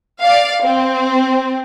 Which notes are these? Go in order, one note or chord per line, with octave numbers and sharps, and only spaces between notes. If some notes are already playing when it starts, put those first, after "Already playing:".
D5 F5
C4